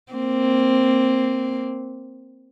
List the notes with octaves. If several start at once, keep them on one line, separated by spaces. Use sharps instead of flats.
A#3 C4